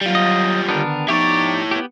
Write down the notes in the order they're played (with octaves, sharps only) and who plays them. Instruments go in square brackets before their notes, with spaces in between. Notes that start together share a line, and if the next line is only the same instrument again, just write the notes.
[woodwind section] F#3 [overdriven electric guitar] G3 F4
[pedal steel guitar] D#5
[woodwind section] D3 D#3 [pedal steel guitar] B3 D4 A#4
[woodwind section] F3 B3 D#4 [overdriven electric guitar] E4 C#5 [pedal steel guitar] G4 D5
[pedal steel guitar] B3 G4